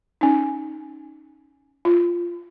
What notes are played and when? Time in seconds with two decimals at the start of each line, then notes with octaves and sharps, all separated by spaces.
0.21 C#4 D#4
1.85 F4